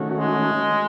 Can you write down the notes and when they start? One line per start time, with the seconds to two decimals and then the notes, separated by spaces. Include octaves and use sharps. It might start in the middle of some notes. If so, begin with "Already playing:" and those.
Already playing: D#3 A3 C#4 F#4
0.18 G#3